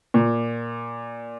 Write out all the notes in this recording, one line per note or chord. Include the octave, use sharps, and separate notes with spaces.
A#2